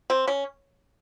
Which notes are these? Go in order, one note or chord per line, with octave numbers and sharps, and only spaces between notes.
C4
C#4